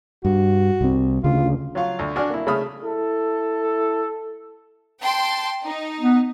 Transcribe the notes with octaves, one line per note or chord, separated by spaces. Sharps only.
G2 F#4
C2 C4
D2 C#3 F4
F#3 F4 F5 C#6
D2
D4 F#4 D5 G#5 F6
A#3 E4
C#3 A3 E5 B5 D#6 F6
E4 A4
G5 A5 C6
D#4
B3